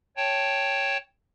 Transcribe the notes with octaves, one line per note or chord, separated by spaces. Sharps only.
C#5 G5 A5